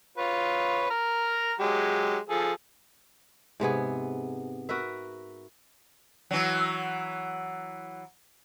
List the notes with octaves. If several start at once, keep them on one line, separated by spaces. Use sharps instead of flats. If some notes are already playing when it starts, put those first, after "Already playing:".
F4 B4 C#5
A#5 F6
F#3 G#3 G4
F3 G#4 A4
G#2 C3 B3 G#4
F#4 A#4 B4 E5
E3 F#3